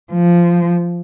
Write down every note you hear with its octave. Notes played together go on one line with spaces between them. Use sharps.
F3